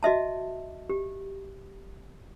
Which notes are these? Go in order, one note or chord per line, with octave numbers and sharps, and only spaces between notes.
F#4 D#5 E5 A5
G4